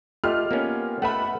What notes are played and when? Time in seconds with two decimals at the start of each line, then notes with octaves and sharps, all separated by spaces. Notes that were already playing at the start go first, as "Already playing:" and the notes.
0.24 A3 F4 G4 D#5 F6
0.51 A#3 B3 C#4
1.02 A3 B4 E5 F#5 B5